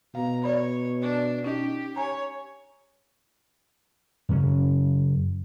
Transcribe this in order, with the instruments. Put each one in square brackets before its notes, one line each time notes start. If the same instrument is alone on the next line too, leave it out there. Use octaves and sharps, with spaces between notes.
[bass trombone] B2 [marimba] F5 [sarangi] A#5
[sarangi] C#5 [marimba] D5 B5
[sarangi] D4
[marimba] C#4 D#4 D#5 [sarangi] G4
[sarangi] C#5 [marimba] G#5 A#5
[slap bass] F#2 C#3 F#3 C#4